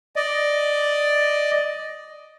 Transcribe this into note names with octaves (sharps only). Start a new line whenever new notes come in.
D5 D#5